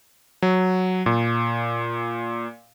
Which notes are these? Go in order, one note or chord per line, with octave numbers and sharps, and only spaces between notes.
F#3
A#2